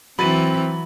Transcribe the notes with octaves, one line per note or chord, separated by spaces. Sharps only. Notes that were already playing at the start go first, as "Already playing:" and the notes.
E3 F#3 C4 B5 A6 D#7